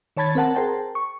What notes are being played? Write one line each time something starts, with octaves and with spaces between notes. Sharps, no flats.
D#3 C#5 A5 B5 G#6 A6
C4 A#4 F#5 A5
G#4 A#4 C5 G5 A5
C#6